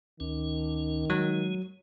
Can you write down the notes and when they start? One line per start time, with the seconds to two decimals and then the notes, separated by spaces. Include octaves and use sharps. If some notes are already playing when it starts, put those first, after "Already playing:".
0.20 D2 D#3 C#4
1.10 F#3 G#3